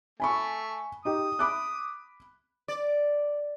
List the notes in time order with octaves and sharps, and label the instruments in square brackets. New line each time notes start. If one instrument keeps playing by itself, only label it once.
[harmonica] A3 [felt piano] G#5 B5 C#6
[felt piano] D#4 G4 [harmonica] D#6
[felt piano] B5 D6 F#6
[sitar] D5